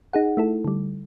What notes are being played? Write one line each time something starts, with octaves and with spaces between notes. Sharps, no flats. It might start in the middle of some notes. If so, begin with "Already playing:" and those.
D#4 G#4 F#5
A3 E4 A4
D3 G3